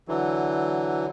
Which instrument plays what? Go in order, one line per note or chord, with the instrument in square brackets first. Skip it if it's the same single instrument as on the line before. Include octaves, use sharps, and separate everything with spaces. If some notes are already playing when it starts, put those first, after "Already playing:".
[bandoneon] D3 E3 F#3